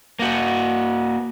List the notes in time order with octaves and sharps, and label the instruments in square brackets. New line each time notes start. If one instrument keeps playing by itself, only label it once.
[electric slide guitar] A#3 F#4